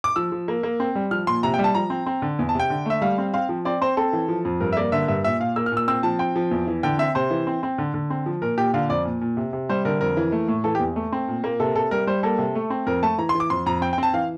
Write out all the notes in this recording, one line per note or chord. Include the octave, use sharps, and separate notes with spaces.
D6
F3 E6
F3
A#3
A#3
C4
G3
F3 F6
A#2 C6
C3 A#5
G5
G3
A5
F3 A#5
C4
C4
D3
E2
A5
C3 G5
D3
A3 E5
G3 F5
C4
C4 F5
F3
C4 D5
C4 C5
C4 A4
E3
F3
F2
G2 A#4
E5
A#3 D5
D3 E5
G2 E5
A#2 E5
A#2 F5
A#3 E6
F6
A#2
E6
C4 E6
F3 A5
C4 G5
F3
E2
E3
D3 G5
C4 E5
C3 C5
E3
C4
C4
D3
D3
C4
F3
A#2 A#4
A#2 G4
D3 F5
F2 D5
A#2
A#2
C3
C3
G3 C5
D3 A#4
F2 A#4
E3
A3
A2
E3 A4
G4
E2
A3
C4
A#2
A#3
C3 A4
C3 A4
G3 A#4
G3 C5
A#3 A4
C3
A3
C4
F2 A#4
A3 A5
E3 A#5
C6
E3
D6
F2 C6
F2 A#5
C4 G5
G5
C4 A5
E3 F5